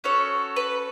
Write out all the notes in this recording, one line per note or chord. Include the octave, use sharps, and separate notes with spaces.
C#4 F#4 A4 C#5
B4